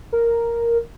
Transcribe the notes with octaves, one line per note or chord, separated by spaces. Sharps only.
A#4